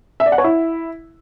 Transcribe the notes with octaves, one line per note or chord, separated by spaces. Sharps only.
E5
D5
F#5
C#5
E4